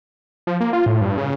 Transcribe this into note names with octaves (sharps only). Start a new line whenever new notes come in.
F3
A#3
F4
A2
G2
C#3